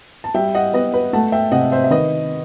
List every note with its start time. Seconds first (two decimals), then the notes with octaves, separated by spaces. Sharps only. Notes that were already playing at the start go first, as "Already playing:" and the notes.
0.24 A5
0.34 G3 E5 G5
0.55 D#5 F#5
0.74 B3 B4 D#5
0.94 B4
1.13 A3 F#5 A5
1.32 E5 G5
1.52 C3 D#5 F#5
1.72 C5 E5
1.84 E5
1.91 D#3 B4 D#5